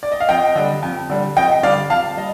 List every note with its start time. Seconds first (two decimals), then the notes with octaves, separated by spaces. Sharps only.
0.03 D5
0.12 D#5
0.20 F5
0.29 F2 D#5 G5
0.55 D3 G3
0.82 F2
1.10 D3 G3
1.36 F2 D#5 G5
1.63 D3 G3 D5 F5
1.90 F2 F5 A5
2.17 G3 D#5